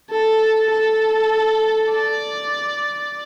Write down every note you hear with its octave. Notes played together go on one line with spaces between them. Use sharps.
A4
A4
D5